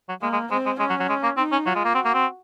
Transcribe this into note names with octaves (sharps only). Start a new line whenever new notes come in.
F#3
G#3 A#3
G#3
G#3 C4
G#3
G#3 C#4
F#3
F#3
G#3
A#3
C4 D#4
C#4
F#3 F4
G#3
A#3
C4 F#4
A#3
C4